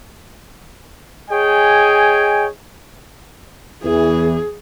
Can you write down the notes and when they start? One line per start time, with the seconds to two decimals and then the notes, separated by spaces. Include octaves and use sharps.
1.30 G#4 C#5 D#5 G5 G#5
3.83 E2 E3 G#4